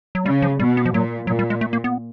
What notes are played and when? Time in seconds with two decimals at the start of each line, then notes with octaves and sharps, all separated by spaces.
0.15 F#3
0.26 C#3 G3
0.42 F3
0.59 B2 G3
0.77 B3
0.86 F3
0.94 A#2 F#3
1.27 A#2 F#3
1.39 G3
1.50 G#3
1.61 A3
1.73 A#3
1.84 B3